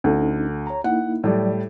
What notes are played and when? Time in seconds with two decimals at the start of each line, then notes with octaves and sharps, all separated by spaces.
0.04 D2 C#4 D#4 A4
0.67 C#5 A#5
0.84 A#3 D#4 E4 F#5
1.24 A2 F#3 G3 D5